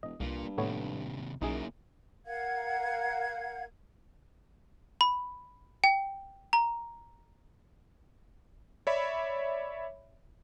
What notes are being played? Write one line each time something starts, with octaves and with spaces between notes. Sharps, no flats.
E1 D#5
C2 G2 A#3 F4
D#2 A2 C3 A3 B3 C#5
B1 F#2 A#3 D#4 E4 G#4
A#4 F5 F#5 G#6
B5
G5
A#5
C#5 D5 E5 B5